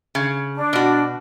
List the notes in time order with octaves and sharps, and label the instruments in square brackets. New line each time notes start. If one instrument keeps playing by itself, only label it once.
[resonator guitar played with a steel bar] C#3
[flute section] D4
[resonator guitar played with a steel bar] B2 F#4